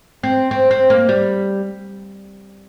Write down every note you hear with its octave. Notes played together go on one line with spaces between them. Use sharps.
C4
C4
C4
A#3
G3